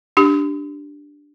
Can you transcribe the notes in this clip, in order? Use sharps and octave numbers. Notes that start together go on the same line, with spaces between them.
D4 G4